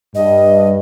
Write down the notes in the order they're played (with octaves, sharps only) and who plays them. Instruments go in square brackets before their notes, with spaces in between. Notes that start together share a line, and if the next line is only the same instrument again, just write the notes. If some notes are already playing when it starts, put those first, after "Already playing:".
[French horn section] G2 [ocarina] D#5